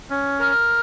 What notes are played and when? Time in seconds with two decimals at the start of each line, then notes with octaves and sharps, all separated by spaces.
0.10 C#4
0.39 A#4